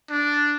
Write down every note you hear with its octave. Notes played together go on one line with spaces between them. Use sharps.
D4